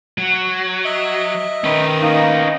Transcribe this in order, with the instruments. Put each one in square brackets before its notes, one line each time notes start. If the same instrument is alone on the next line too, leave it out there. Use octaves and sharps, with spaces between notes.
[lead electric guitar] F#3
[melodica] D#5 E5
[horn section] D#3 [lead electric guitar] C#4 B4
[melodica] A#3 [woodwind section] D#4 D#5